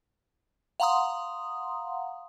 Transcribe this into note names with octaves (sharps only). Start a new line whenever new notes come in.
F5 F#5 A#5 C6 D#6